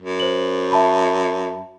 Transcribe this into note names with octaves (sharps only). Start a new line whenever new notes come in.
F#2
C5 F#7
E5 A5 B5